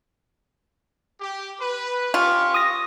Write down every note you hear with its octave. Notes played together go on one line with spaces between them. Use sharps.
G4
B4
C#4 F4 G4 C#6
D#6 A#6